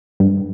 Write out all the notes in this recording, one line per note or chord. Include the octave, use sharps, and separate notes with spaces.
G2